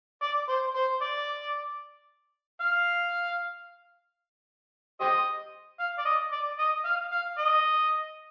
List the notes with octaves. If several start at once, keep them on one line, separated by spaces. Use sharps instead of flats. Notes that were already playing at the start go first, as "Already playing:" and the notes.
D5
C5
C5
D5
F5
G4 C5 D#5
F5
D5
D#5
D5
D#5
F5
F5
D#5